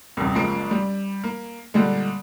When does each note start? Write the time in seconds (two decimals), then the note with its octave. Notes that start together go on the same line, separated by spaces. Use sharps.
0.17 D#1 C2
0.34 F#1 F3 G#3 A#3 D7
0.71 G3
1.24 A#3
1.74 A#2 D3 G3 G#3